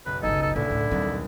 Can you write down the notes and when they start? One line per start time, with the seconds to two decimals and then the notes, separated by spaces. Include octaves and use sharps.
0.06 F#1 B1 B4
0.23 G1 C#2 D#4 A4 G#5
0.42 A4
0.56 B1 A#2 D3 B3 E4
0.70 D2 A2
0.91 D#1 D#2 G3 C4